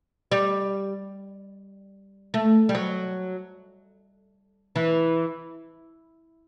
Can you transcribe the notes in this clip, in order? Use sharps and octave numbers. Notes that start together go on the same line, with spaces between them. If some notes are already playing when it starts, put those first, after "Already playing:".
G3
A3
G3
F#3
E3